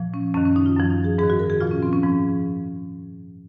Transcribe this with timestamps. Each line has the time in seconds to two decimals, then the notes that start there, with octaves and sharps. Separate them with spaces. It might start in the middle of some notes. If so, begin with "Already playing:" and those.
Already playing: A#2 F3
0.14 C#4
0.34 F#2 C#4
0.37 D#3
0.45 C#4
0.56 D#4
0.66 F4
0.77 F#2 F3
0.90 D#4
1.04 G#4
1.18 G#2 G#4
1.23 D#3
1.30 F#4
1.39 A#4
1.50 G#4
1.60 A#2 F3 F4
1.71 C#4
1.83 C4
1.93 C#4
2.03 G#2 F3